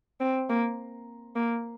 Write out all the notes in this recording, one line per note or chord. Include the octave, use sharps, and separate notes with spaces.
C4
A#3
A#3